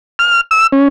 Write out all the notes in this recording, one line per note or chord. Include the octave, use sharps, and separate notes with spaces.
F6
E6
C#4